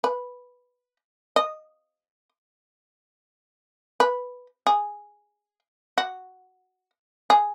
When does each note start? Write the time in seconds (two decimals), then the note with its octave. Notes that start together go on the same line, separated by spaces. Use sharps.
0.04 B4
1.36 D#5
4.00 B4
4.67 G#4
5.98 F#4
7.30 G#4